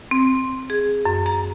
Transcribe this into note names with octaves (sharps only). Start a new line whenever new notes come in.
C4
G#4
F#2
A#5